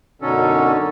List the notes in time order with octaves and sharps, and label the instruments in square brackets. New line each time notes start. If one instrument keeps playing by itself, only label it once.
[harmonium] F#2 D#4 F#4 [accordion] B2 C#4 A4 [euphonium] D3